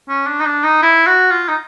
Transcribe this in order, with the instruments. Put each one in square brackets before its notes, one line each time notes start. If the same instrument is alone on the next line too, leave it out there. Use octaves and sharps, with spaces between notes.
[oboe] C#4
D4
D#4
D4
D#4
E4
F#4
F4
D#4